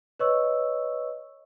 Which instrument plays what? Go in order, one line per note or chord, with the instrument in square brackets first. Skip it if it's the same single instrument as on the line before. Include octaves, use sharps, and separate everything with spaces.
[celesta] B4 C#5 D#5 C#6 E6